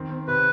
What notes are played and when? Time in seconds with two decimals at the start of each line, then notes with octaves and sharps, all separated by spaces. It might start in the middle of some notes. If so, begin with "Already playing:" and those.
Already playing: D#3 C4
0.10 C4
0.28 C3 B4